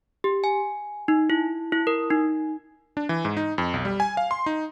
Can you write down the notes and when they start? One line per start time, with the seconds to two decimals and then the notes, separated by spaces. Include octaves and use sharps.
0.24 G4
0.44 G#5
1.08 D#4
1.30 E4
1.72 E4
1.87 A#4
2.10 D#4
2.97 D4
3.09 E3
3.25 G#2
3.37 D#4
3.58 F2
3.74 B1
3.85 G3
4.00 G#5
4.17 F5
4.31 C6
4.46 D#4